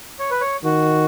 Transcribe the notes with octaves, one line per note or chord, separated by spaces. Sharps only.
C#5
B4
C#5
D#3 F#4